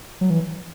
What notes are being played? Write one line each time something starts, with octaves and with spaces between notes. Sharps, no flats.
F#3
E3